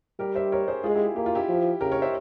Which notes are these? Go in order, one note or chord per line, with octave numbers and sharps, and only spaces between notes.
G3 G4 A#4
C5 E5
A#4 C#5
G#4 C5
G#3 F4 G#4
E4 G4
A#3 G4
F4
E4 G4
F3
C#3 G4 A#4
A#4 C#5
C5 E5